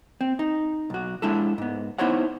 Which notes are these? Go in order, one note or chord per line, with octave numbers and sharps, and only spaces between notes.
C4
D#4
B1 F#4
G#3 D4 E4 A4
G#2 B3
B3 D#4 E4 C5 C#5 F#5